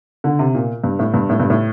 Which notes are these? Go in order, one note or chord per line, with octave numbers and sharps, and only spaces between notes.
D3
C3
A#2
G2
A2
G2
A2
G2
A2